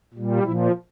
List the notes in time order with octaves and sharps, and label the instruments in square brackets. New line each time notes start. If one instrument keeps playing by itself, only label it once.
[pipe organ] A#2 G3
A#2 F3 E4